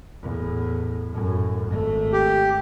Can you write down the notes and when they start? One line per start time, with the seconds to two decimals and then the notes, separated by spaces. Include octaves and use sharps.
0.22 E2 A2
1.10 F#2 A2
1.67 G#1 A3
2.13 G4